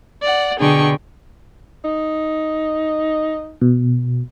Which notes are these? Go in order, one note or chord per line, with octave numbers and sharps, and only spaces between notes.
D5 F#5
B2 D3 G#4 G5 C#6
D#4
B2